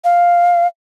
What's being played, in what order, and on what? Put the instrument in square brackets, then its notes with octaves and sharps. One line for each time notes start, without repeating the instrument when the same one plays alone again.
[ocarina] F5